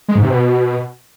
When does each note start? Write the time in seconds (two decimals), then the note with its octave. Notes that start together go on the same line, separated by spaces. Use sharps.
0.08 G#3
0.16 G#2
0.23 C3
0.30 B2